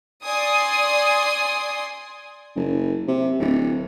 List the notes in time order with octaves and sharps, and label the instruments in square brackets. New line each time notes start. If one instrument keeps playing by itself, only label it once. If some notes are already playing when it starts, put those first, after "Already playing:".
[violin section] D5 G#5 C6 D#6
[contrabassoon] F#1
C3
D1